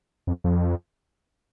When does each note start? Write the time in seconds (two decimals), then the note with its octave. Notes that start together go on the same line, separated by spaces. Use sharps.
0.27 F2
0.44 F2